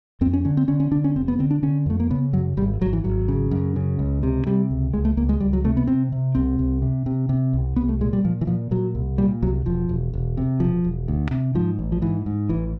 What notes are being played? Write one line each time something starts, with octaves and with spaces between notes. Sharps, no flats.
F2 C4
C#4
D3 C#4
C4
D3 C#4
C#4
D3 D4
C#4
F1 C4
B3
D3 C4
D4
D3 C#4
F2 A3
A#3
C#3 B3
F#2 F#3
G#1 G3
G#1 F#3
E3
G#1 F#3
C#3
F#2
C#3
C#2
C3
C3 G3
C#2
C#2 G#3
A3
C#2 A#3
G#3
C#2 G3
F#3
C3 A3
B3
C3 C4
C3
C2 C4
C2
C3
C3
C3
C2
C2 B3
A3
A#2 G#3
G3
A#2 F3
E3
A#2 F3
A#2 F#3
C2
A#2 G3
C2 F#3
E1 F3
E1
E1
C3
E1 F3
E1
D2
C3
G#2 F3
A1
F3
G#2 E3
G#2
A1 E3